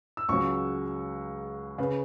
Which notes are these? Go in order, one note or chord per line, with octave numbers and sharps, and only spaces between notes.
E6
C#2 C#3 F#3 C#6
C#3 B4